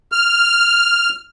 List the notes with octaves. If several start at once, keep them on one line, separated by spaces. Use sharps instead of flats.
F6